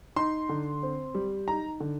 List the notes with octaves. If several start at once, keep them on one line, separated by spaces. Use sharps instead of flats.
D#4 C6
D3
C4
G3
D#4 A#5
D3